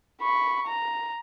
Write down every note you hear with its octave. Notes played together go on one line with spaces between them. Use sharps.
B5 C#6
A#5